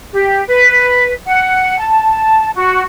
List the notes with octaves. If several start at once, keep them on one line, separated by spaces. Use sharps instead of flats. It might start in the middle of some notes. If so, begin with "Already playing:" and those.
G4
B4
F#5
A5
F#4